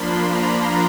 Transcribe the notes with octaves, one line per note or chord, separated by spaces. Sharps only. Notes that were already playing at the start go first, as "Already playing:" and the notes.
Already playing: F3 A#3 D4 B5 C6
A#5